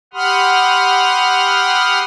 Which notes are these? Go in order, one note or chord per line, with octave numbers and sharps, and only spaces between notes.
G4 F#5 B5 C6 D#6 F6